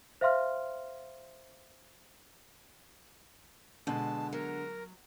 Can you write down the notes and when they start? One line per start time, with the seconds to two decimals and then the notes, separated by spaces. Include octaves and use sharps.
0.21 C5 E5 F5 C6 F6
3.87 B2 D3 G#3 A5
4.33 F#3 A#4